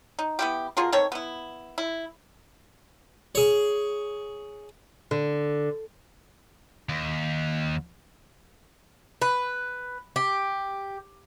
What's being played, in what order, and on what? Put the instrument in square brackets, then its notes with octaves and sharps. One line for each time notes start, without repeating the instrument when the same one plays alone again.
[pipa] D#4
B3 E4 G4
B2 F4 G#4 A#4
D#3 C4 A4 C#5
B3 E4
E4
[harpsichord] G#4 C#5
[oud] D3
[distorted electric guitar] D#2
[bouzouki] B4
G4